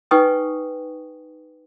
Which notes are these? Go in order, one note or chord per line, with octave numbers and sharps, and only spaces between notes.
D#4 B4 G5 G#5 C#6 D#6